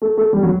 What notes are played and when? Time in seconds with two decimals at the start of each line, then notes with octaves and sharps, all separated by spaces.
0.02 A3
0.17 A3
0.33 G3
0.43 F#3